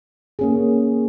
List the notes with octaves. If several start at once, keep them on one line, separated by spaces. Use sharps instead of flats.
A#3 C#4 G#4